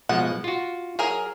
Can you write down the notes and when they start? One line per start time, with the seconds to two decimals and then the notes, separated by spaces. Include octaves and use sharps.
0.09 B2 F3 G#3 F#5
0.44 F4 F#4
0.99 F#3 G#4 A#4 G#5